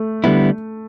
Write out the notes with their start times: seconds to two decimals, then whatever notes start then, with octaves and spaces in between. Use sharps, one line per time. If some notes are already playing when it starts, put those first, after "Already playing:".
Already playing: A3
0.24 D3 G3 B3 E4